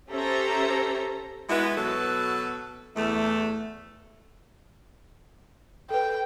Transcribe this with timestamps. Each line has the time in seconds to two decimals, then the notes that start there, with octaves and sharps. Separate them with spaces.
0.10 C#4 G4 A4 C5 E5 A#5
1.49 G#3 B3 E4 F#4
1.77 B2 F#3 A4 B4
2.96 E2 A3
5.90 A4 B4 G5